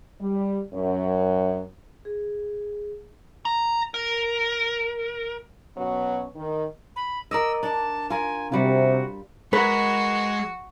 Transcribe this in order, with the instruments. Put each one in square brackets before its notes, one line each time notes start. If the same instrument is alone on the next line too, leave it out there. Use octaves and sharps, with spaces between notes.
[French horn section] G3
F#2
[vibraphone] G#4
[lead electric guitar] A#5
A#4
[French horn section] B2 F#3 B3 C#4 F#4
D#3
[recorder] B5
[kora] A#4 D5 D#5 [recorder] E6
[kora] D4 [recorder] A5
[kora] F4 A#4 [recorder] G#5
[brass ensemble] C3 [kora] G3 F4 [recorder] F#4
[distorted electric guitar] G#3 [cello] F#4 [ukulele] A#4 B4